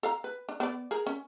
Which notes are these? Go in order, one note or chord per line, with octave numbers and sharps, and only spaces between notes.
A4 F5 A#5
B4
D4
B3 D5
G#4 A#4
C#4